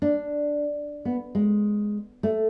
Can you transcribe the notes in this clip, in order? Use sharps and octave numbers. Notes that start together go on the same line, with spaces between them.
D4
B3
G#3
A3